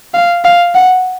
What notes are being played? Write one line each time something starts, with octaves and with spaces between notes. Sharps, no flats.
F5
F5
F#5